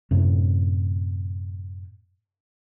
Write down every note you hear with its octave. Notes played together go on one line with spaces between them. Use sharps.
F#2 A2 C3